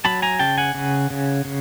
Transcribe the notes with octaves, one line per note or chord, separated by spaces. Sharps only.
F#3 A5 B5
G#5 A#5
C#3 G5 A5
F#5 G#5
C#3
C#3
C#3